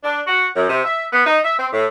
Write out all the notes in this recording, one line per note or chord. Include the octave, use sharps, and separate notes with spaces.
D4
F#4
F#2
C3
E5
B3
D#4
E5
C4
A2